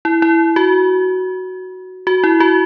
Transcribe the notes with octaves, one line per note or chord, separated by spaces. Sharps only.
E4
E4
F#4
F#4
E4
F#4